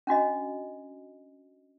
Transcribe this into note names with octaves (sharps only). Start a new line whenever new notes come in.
C#4 D4 F#4 D#5